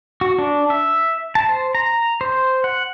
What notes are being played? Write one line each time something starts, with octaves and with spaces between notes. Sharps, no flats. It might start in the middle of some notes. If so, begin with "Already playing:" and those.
F#4
D4
E5
A5
C5
A#5
C5
F#5